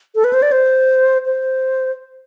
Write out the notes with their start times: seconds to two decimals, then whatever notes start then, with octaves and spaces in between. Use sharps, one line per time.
0.15 A4
0.24 B4
0.33 C5
0.42 D5
0.52 C5
1.26 C5